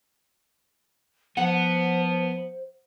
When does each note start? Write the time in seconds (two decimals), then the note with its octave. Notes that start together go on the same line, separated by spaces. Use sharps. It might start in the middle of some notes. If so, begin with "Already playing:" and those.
1.37 F3 B3 C5 F#5